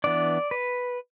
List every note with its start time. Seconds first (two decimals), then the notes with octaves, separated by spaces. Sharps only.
0.04 E3 B3 D4 D5
0.51 B4